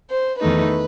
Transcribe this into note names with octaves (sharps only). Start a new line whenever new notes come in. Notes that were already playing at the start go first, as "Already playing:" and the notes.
C5
E2 D#3 A3 D#4 B4